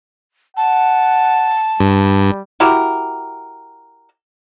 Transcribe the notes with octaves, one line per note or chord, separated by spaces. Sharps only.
F#5 A5
G2 G3
E4 F#4 G4 A#4